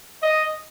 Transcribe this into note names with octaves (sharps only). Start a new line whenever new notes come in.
D#5